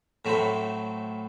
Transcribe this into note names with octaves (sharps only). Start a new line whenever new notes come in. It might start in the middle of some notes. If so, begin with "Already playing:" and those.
A2 F#3 A3 C4 E4